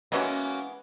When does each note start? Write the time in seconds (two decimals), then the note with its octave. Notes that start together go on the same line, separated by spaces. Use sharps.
0.12 E3 G#3 A#3 B3 C#4 F#4